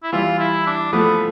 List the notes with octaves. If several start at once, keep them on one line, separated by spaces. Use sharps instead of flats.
E4
E3 G3 F4
E4
D4
F3 A3 B3